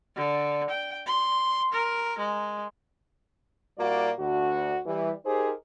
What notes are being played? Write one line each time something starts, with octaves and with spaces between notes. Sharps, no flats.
D3
G5
C6
A#4
G#3
A#2 G3 A#3 E4 F#4 D5
D2 D3 F#4
E3 G3
D#4 G4 G#4 A#4 C5